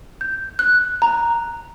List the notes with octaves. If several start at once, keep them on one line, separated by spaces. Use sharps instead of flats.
G6
F#6
A#5